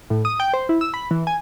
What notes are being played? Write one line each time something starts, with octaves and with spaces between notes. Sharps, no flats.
A2
D#6
G5
C5
E4
E6
B5
E3
G#5